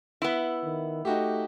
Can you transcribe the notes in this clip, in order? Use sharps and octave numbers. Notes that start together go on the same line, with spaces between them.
B3 E4
D#3
A3 D#4 F#4 G4